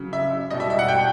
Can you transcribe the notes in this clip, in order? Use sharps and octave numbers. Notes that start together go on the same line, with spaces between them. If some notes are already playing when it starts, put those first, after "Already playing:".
Already playing: C#3 F#3
E5
B2 G3 D#5
E5
E5
F#5
G5